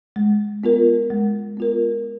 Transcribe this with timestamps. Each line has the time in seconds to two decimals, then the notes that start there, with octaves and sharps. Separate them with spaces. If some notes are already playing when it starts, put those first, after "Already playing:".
0.16 G#3
0.64 B3 F4 A#4
1.10 G#3
1.57 B3 F4 A#4